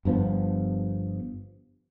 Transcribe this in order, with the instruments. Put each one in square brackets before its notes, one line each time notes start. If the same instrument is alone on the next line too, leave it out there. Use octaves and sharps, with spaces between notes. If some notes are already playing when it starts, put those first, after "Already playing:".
[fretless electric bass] G1 G2 F3 B3